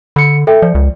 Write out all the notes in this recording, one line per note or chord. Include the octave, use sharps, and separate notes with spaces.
D3 B5 C#7
A4 E5 G5
F3 D5
C#2